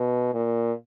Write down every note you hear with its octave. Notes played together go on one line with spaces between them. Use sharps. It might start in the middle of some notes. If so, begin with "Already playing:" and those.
Already playing: B2
A#2